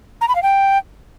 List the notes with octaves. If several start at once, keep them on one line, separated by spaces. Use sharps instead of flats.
A#5
B5
F5
G5